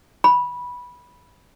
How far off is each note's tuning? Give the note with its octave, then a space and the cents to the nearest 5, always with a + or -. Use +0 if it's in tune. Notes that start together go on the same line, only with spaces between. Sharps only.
B5 -15